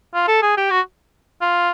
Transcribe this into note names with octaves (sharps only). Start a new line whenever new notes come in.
F4
A4
G#4
G4
F#4
F4